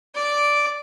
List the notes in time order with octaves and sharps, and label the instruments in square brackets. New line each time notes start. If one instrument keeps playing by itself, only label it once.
[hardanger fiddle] D5 D6